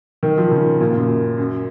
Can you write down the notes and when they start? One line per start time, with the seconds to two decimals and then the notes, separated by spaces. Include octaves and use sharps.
0.23 D#3
0.38 F3
0.51 C#3
0.81 A#2
0.95 F#2
1.38 F#2